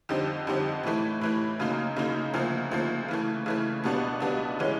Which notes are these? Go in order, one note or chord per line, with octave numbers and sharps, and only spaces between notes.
F2 D3 G3 C4 D#4
F2 D3 G3 C4 D#4
A2 E3 A3
A2 E3 A3
F#2 C#3 F#3 A#3 D#4
F#2 C#3 F#3 A#3 D#4
D2 C#3 F3 A#3
D2 C#3 F3 A#3
C#3 E3 A3
C#3 E3 A3
C#2 B2 G3 B3 D4
C#2 B2 G3 B3 D4
C#3 E3 G#3 C#4